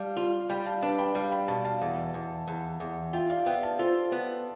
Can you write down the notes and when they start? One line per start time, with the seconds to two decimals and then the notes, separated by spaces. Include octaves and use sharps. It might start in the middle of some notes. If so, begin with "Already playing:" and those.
Already playing: G3 F5 A5
0.17 F4
0.50 G3 G5 B5
0.66 F5 A5
0.82 D4 B4 D5
0.98 G5 B5
1.15 G3 F5 A5
1.32 G5 B5
1.48 B2 F5 A5
1.64 F5 A5
1.82 E2
2.14 E2
2.48 E2
2.80 E2
3.13 F4 E5 G5
3.30 D5 F5
3.46 B3 E5 G5
3.63 F5 A5
3.79 F4 A4 C5
4.12 B3